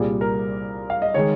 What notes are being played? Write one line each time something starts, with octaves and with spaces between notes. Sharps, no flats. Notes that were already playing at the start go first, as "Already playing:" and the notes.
Already playing: C2 A#2 G3 G#4
A#4
F5
D#5
D#3 G#3 C#5